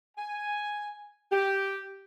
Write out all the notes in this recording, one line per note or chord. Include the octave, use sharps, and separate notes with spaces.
G#5
G4